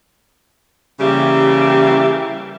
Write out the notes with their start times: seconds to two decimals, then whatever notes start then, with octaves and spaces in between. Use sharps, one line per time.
1.00 C#3 E3 G3 A#3 G4 E5